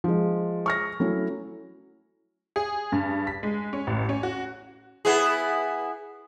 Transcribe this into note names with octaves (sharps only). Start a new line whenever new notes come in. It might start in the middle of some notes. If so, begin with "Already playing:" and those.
F3 G#3
C#6 F6 A#6
F#3 A3 C#4 E4
G#4
G2
B6
G#3
C#4
A1
C#4
F#4
B3 E4 G#4